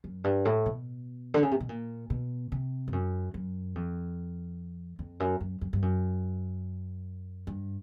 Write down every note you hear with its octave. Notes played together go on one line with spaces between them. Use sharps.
F#2
G2
A2
B2
D3
C#3
C3
B2
A#2
B2
C3
G2
F#2
F#2
F2
F2
F#2
F#2
F#2
G2
F#2
G2